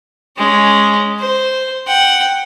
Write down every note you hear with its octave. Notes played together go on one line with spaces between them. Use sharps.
G#3 C#4
C5
F#5 G5